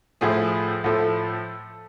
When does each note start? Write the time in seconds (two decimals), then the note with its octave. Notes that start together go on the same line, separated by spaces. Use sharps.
0.21 A2 F3 A3 G#4
0.84 A2 F3 A3 A4